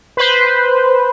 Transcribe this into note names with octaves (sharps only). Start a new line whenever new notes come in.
B4 C5